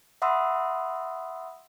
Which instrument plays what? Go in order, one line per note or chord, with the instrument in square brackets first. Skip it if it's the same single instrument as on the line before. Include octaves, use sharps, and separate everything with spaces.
[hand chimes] E5 F#5 B5 C6 D#6 E6